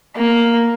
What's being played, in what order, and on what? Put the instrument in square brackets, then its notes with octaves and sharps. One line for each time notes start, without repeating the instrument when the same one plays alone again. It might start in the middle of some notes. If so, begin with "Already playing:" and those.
[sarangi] A#3